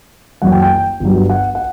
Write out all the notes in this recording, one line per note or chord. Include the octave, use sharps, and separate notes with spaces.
F#1 F#2 F#3 F#5
G5
G5
G1 G2 F#3
F#5
F#5